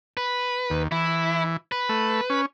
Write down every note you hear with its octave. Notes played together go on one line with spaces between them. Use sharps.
B4
D#2
E3 E4
B4
A3
C#4